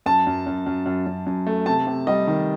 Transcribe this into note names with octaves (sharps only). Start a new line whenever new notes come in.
F#2 A5
F#2
F#2
F#2
F#2
F#2
F#2
A3
C3 A5
C3
G3 D#5
D#3